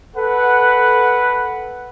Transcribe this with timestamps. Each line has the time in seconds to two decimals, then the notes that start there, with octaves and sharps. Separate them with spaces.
0.17 A4 B4 F#5